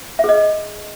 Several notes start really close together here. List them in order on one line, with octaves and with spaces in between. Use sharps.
E5 G#4 D#5